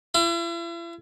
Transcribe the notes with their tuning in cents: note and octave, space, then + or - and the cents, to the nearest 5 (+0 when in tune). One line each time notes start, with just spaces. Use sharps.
E4 +45